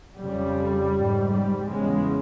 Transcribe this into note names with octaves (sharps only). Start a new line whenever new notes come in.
F2 C#3 G3
G#2
G3
E2 C#3 G#3